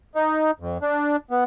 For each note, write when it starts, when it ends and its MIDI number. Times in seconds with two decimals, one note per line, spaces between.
0.15 0.51 63
0.60 0.78 41
0.82 1.16 62
1.31 1.44 59